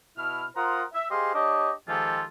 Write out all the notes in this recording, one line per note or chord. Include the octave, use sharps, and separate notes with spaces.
B2 E4 B5 F6
F4 A#4 C5 F#5 A#5 D#6
E5
G4 G#4 C5 D#5 F5 C6
D4 G4 C#5 D#5
D#3 F3 G#3 F4 G4 A4